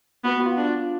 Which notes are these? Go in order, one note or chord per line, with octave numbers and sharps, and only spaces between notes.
B3 F#4
F#4
F4
D4
F4